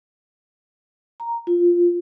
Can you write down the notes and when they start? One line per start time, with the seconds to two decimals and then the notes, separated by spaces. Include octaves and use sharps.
1.20 A#5
1.47 F4